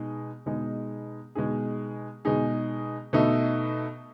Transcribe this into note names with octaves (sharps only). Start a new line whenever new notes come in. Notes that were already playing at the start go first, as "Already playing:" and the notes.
Already playing: B2 G#3 D#4 G#4
B2 G#3 D#4 G#4
B2 G#3 D#4 G#4
B2 G#3 D#4 G#4
B2 A3 D#4 A4